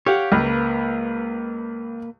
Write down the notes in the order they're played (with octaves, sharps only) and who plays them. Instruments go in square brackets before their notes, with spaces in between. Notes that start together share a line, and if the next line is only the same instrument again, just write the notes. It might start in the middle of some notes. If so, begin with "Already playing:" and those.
[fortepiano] G4 [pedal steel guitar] C#5 F5 F#5
[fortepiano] C#2 [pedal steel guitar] A#3 B4